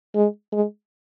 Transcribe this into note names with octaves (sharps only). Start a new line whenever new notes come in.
G#3
G#3